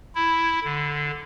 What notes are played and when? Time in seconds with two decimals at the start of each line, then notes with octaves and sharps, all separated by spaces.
0.15 E4
0.64 D3